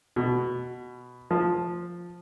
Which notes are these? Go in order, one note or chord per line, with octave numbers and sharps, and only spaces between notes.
B2
F3